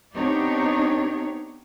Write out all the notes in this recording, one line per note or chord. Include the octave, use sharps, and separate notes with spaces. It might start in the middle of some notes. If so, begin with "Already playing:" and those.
B3 C4 D4 D#4 G4 C#5